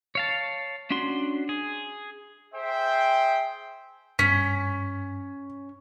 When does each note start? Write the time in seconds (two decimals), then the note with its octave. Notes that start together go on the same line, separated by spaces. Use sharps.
0.15 C#5 F5 A5
0.90 C#4 D4 F#4 C6
1.49 G#4
2.55 G#4 C5 E5 G5
4.19 G2 C#4 B6